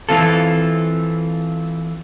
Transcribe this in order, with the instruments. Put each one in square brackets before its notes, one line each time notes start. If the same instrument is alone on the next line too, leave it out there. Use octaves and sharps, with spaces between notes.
[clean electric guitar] E3 C4 F4 A4